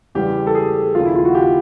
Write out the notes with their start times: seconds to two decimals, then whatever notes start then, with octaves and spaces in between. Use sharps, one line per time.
0.15 E2 C#3 E3 G3 G4
0.47 A4
0.55 G#4
0.95 D#2 C#3 F3 F4
1.05 E4
1.15 F4
1.25 F#4
1.35 G4